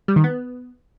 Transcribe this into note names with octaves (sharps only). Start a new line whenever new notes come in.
G3
D#3
B3